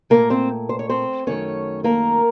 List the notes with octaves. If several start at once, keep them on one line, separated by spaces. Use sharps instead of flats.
A#2 F3 A3 A#3 A#4
C4 C5
C5
C#5
C4 C5
F#2 D#3 A3 C#4 C#5
A#3 A#4